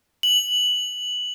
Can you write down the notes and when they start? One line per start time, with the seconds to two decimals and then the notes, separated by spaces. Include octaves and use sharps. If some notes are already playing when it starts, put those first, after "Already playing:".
0.23 F#7